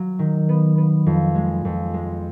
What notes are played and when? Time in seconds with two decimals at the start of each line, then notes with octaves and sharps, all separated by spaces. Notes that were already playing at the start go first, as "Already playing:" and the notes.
Already playing: F#3
0.19 D#3
0.49 B3
0.78 B3
1.06 F2
1.35 G#3
1.65 F2
1.94 G#3